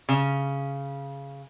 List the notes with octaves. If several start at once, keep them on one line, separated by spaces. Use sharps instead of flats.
C#3